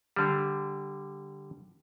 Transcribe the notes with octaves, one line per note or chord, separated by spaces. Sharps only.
D3 G3